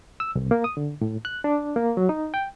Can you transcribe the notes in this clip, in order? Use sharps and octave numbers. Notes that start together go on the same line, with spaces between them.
E6
C2
A#3
D#6
D3
A2
F#6
D4
A#3
F#3
D#4
G5